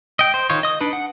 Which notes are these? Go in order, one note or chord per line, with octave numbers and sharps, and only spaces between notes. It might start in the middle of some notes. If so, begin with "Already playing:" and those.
D#5 G5
C5
D#3 D#4 F4 C#5
D#5 D#6
D4 D#4 B4
F#5